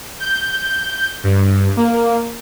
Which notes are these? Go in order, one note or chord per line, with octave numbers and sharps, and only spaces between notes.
G6
G2
A#3